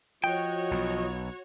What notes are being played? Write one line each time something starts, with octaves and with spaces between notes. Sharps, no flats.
F3 F#4 C#5 D#5 G5
B1